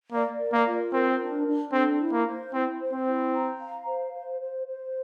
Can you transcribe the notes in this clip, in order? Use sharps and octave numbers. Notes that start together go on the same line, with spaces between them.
A#3 D5
A#4
A#3
F4
C4 A#4
D4
D4
C4 A4
E4
A#3
C5
C4 E4
C5
C4
E4
A#5
F5
C5
C5
C5
C5